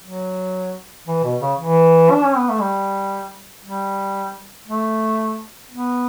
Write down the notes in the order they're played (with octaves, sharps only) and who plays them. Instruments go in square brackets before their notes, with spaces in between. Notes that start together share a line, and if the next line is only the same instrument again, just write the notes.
[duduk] F#3
E3
B2
C#3
E3
D4
C#4
B3
A3
G3
G3
A3
B3